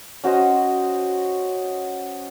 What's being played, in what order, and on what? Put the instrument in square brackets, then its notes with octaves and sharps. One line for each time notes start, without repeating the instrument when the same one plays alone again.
[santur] C#4 F#4 C5 D#5